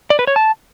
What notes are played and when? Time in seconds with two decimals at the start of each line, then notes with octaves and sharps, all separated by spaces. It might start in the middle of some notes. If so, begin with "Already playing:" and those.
0.10 D5
0.19 B4
0.27 C#5
0.36 A5